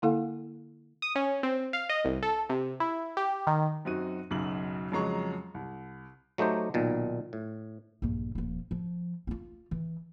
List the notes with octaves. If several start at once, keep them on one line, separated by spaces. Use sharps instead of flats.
D3 A#3 E4 A4 F5 G#5
D#6
C#4
C4
F5
D#5
C2
A4
C3
E4
G4
D#3
F#2 C4 D#4 F#4 D#7
B1 F#2 C#3 D#4 F#7
F2 C#3 F#3 G#3 A#5 C#6
C2
F#3 A3 D#4 G4 C5
B1 A#2 D#3
A2
A#1 G2
D#1 F3
F3
C4 F4
E3